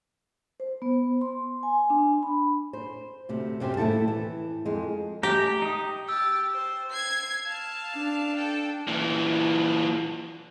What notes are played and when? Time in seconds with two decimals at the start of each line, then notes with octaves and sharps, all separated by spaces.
0.60 C5
0.82 B3
1.21 C6
1.63 G#5
1.90 D4
2.23 B5
2.73 C5
3.29 D2 C3
3.60 F#2 C3 G4 C5
3.77 D#2 A2 E4 A4 A5
4.08 E3
4.66 F2 G#3
5.23 G#3 A3 G4 A#5
5.62 D#4 D#6
6.09 G4 E6 A6
6.53 C5
6.91 G#6 C7
7.47 F5 A5
7.95 D4
8.36 A4 G5
8.88 A#2 E3